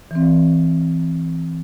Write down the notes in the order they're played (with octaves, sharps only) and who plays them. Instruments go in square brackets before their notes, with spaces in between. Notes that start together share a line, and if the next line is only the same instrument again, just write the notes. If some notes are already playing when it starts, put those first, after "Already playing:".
[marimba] E3 C4